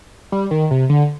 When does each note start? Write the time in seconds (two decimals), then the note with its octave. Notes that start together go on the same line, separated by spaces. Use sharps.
0.32 G3
0.51 D#3
0.71 C3
0.90 D3